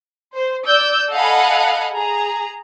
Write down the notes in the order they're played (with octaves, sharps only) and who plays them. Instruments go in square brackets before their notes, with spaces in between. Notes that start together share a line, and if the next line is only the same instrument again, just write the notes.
[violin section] C5
D5 E6 G6
A4 D#5 F5 F#5 G#5 B5
G#4 A#5